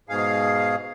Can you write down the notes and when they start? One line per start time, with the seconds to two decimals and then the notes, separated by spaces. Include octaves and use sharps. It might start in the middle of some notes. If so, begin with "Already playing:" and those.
0.09 G#2 B2 G#4 F5